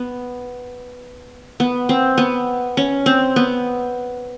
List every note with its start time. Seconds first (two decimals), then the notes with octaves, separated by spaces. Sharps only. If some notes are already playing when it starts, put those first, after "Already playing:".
Already playing: B3
1.60 B3
1.89 C4
2.18 B3
2.77 C#4
3.06 C4
3.36 B3